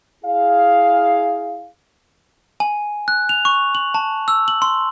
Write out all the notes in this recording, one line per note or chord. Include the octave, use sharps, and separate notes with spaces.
E4 G#4 F5
G#5
F#6
F7
C#6
F#7
A5
E6
F#7
C6